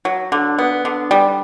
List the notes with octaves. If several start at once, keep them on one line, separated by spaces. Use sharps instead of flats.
F#3
D3
B3
D3
G3